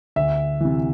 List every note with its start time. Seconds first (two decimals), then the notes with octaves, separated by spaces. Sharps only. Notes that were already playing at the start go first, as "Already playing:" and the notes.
0.16 D2 E5
0.60 C3 E3